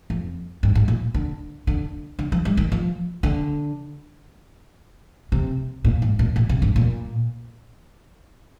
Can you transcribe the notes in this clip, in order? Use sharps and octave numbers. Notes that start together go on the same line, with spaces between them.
F2
G2
G#2
A#2
D3
D3
D3
F3
G3
D#3
F3
D3
C3
A#2
G#2
A#2
A#2
C3
G2
A#2